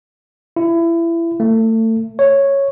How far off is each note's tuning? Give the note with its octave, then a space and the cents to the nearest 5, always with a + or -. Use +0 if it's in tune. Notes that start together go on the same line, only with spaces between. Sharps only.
E4 +25
A3 +30
C#5 -5